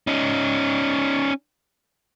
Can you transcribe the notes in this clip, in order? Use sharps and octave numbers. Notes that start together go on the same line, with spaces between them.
C#4 D#4